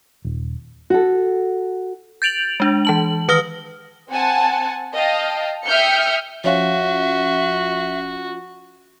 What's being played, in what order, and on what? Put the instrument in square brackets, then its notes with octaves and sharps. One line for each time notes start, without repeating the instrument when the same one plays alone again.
[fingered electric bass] D#1
[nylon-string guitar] F#4 A4
[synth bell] G6 A6 D7 F7 F#7
G#3 D4
E3 A5 F#7
D#3 B4 D#6 F6 A#6 G7
[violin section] C4 F#5 G#5 A5
D#5 F5 G5 A5
E5 G5 D#6 F6 G6 C#7
[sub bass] D#1 [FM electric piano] F3 C#4 F4 [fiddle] F#4 [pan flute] E5